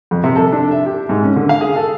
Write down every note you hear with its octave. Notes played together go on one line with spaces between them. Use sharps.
F2
C3
A4
D4
E5
G4
G#2
C#4
D3
F5
G#4
A4